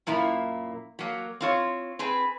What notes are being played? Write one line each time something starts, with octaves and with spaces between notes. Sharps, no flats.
F#2 A#2 A#3 E4
F#3 A#3
C4 F4 C#5
C4 G#4 B4